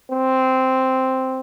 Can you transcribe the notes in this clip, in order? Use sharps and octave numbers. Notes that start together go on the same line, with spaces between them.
C4